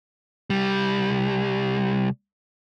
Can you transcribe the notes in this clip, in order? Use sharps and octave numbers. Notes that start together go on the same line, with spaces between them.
C2 G3